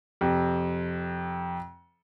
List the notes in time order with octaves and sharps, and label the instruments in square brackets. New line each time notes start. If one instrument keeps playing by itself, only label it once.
[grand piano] F2 C3